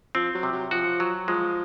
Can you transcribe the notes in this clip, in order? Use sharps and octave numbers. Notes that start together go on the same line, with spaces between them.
F3 C4
F#3
C3
F#3
F3 F#4
F#3
F3 G#3